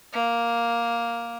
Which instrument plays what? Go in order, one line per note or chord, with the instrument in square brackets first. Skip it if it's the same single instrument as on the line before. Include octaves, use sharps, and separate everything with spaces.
[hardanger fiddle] A#3